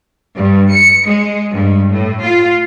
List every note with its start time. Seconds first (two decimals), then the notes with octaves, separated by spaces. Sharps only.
0.36 G2
0.72 C#7
1.08 G#3
1.52 G2
1.90 A2
2.25 F4